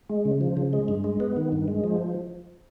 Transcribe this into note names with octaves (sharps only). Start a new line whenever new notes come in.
G#3
C#3
F3
C#3
G#3
G2
G#3
B3
D#3
G2
G#3
F3